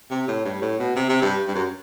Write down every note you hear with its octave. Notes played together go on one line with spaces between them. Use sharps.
C3
A2
G2
A2
B2
C3
C3
G2
G2
F#2